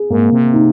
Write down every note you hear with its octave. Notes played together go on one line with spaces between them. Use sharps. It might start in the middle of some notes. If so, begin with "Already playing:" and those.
Already playing: G#4
G#2 A#3
C3
D#4